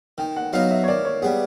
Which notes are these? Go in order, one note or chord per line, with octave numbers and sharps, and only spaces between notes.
D#3 G5
F#5
F#3 B3 D#4 F5
E5
C#5
D#3 D5
C#5
G3 B3 G#4